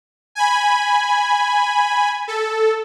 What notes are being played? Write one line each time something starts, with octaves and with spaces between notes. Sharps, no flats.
G#5 B5
A4